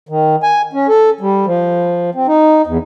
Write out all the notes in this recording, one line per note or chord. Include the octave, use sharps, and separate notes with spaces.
D#3
G#5
C#4
A4
G3
F3
C4
D#4
E2